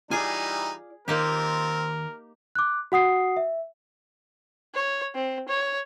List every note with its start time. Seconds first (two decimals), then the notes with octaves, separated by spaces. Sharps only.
0.11 E3 G3 D#4 F4 G#4 D5 G#5
1.08 D#2 A#3 C4 D#4 F4 G4 A#4
2.55 D6 F#6
2.92 F#4 F#5 D#6 C7
3.37 E5
4.74 C#5
5.15 C4
5.48 C#5